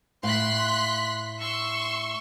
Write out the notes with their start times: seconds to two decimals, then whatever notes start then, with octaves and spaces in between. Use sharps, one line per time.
0.23 A2 F5 C6 F#6 B6
1.40 C6 C#6 E6